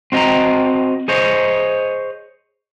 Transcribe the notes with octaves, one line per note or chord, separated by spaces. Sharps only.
C4 F#4 D#5 G5 A#5
G#4 C5 C#5 D#5